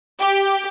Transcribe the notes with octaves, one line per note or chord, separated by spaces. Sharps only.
G4